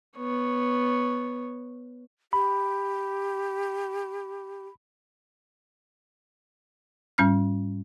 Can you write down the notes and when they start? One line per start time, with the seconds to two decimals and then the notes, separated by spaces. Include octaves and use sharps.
0.17 B3 C#5
2.33 G4 B5
7.18 G#2 G3 C#4 F6